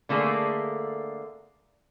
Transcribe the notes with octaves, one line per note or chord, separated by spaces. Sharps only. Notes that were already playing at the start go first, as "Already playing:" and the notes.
D3 A3 A#3 G#4